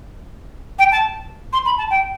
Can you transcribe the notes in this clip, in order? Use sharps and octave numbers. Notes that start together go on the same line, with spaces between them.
G5
A5
C6
B5
A5
G5